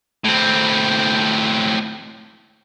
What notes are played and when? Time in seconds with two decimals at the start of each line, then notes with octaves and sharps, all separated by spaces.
0.25 A2 C4